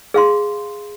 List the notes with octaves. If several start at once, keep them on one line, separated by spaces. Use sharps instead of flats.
G#4 F5 C6